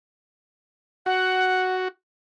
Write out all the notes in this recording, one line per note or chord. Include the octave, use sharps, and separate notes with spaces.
F#4 F#5